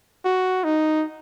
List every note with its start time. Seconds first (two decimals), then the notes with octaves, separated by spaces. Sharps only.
0.25 F#4
0.64 D#4